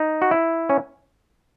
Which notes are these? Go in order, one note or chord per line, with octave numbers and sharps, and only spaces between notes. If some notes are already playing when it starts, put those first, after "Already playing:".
Already playing: D#4
F#4
E4
C#4